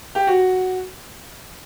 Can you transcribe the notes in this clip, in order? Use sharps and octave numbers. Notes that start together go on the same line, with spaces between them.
G4
F#4